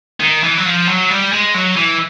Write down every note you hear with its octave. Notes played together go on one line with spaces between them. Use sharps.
D#3
E3
F#3
F3
F#3
G3
G#3
F#3
E3